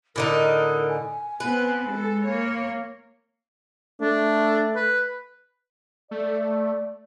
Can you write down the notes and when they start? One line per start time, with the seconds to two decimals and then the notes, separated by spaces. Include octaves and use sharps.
0.16 A2 D3 D#4 A#4
0.89 G#5
1.40 B3 C4 B4
1.89 G#3 A4
2.27 A#3 C#5
4.01 A3 D4
4.76 B4
6.11 A3 D5